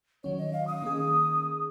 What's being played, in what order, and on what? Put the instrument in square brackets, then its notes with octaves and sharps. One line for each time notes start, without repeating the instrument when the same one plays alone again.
[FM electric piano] D#3 F#3 C#4 [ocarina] C#5
[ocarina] D#5
F5
D#6
[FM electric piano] D#3 A#3 C#4 G#4